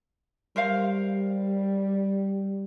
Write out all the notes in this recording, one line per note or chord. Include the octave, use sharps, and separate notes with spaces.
G3 A#4 C5 F5